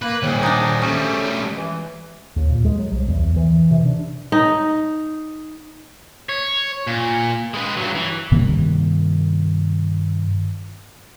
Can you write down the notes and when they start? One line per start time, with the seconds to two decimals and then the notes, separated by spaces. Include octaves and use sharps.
0.02 A#3 B4
0.23 A#2 D#3 G#4 C5 C#5
0.43 D4 D#4
0.82 G3 A3 C#4
1.53 E3
2.36 D#2
2.49 A#2
2.65 G#3
2.79 F#3
2.92 C2
3.08 E2
3.36 E3
3.71 C3
3.86 D4
4.32 D#4
6.29 C#5
6.87 A#2
7.54 G#3 B4
7.77 G2 F#3
7.95 E3
8.32 G2 C3 D#3 A#3